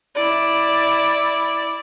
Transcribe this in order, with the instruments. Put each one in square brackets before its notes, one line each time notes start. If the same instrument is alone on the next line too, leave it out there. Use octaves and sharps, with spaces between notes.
[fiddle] E4 D5